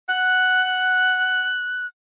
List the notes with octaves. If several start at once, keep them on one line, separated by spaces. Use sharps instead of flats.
F#5 F#6